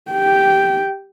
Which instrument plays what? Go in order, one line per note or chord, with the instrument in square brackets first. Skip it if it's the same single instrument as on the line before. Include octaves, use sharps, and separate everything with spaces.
[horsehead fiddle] G4 G5